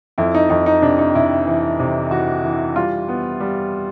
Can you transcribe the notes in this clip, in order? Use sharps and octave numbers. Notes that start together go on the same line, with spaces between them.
F2 E4
D#4
F2 D#4
D#4
C3 D4
D#4
C3 E4
E3
C3
E3 F#4
E3
G3 F4
B3
G3